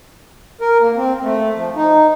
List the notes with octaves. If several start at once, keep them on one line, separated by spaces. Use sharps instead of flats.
A#4
A#3
C4
A3
F3
D#4